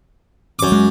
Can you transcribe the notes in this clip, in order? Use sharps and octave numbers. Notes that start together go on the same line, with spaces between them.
F#2 D6
G#3